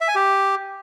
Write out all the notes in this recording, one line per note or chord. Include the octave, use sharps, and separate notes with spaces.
E5
G#5
G4